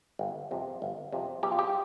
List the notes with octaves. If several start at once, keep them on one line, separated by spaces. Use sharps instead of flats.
G1
F2 C3
G1
F2 C3
B1 G4
F4
G4